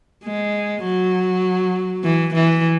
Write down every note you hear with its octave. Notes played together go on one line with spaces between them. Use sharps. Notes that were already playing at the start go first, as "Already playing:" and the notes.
G#3
F#3
E3
E3